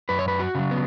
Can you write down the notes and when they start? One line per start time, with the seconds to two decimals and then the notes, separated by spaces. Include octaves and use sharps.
0.09 F#2 B4
0.19 C#5
0.28 B4
0.39 F#4
0.55 C#3 F#3
0.71 B3